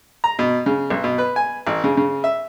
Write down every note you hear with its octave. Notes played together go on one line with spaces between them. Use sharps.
A#5
B2
C#3
B1
B2
B4
G#5
A1
C#3
C#3
E5